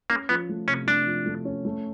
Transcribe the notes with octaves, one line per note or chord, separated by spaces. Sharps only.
A#3 C#4
F3 B3
A3
C3 C#4
A3 D4
F3
A3
C#4
A3